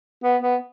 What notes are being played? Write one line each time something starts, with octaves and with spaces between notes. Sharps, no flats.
B3
B3